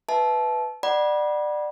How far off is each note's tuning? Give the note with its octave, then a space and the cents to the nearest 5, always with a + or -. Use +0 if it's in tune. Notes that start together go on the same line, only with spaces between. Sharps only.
B4 +0 E5 +0 A5 -25
D5 +25 F#5 +20 B5 -30